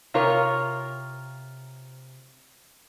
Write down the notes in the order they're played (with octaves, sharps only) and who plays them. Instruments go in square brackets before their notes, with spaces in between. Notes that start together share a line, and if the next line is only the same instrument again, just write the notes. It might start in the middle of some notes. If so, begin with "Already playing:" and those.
[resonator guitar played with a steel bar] C3 F4 A#4 C#5